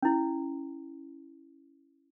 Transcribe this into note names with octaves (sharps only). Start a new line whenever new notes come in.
C#4 E4